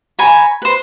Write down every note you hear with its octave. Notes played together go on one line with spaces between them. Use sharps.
C#5 G#5 A#5 B5
B4 C5